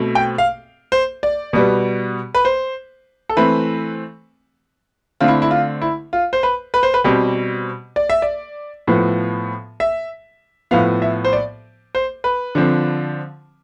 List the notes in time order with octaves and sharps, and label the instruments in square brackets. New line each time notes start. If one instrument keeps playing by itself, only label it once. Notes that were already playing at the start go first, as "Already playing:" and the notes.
Already playing: [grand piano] B2 A3 C4
G5
F5
C5
D5
B2 G3 B3
B4
C5
A4
E3 A3 C4 B4
D3 A3 C4 F4
E4
E4
F4
E4
F4
C5
B4
B4
C5
B4
B2 G3 C4 G4
D5
E5
D5
A2 F3 B3
E5
A2 F3 B3 F5
E5
C5
D5
C5
B4
D3 F3 C4